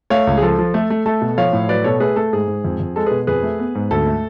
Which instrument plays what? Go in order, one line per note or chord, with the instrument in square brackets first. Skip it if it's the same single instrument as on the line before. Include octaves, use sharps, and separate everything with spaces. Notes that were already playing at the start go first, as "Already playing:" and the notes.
[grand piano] A3 C#5 F5
C#2
G#4
F3 A4
F3
A3
A3
A3 A4
B2
F3 C#5 F5
A2
F#3 B4 D5
B2 A4 C#5
A3 G#4 B4
A3 A4
G#2 G#4
G#2
F2
F2
G#3 A4
B2 G#4 B4
F2 G#4 B4
A3
B3
G#2
D2 A4
A3